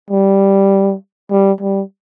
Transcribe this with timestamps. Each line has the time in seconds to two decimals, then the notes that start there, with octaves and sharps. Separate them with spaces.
0.10 G3
1.31 G3
1.61 G3